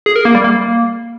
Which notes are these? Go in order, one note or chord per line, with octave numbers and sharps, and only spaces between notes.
G#4
A#4
A#3
G3
A#3